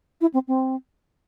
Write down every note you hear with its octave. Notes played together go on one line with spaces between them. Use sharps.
E4
C4
C4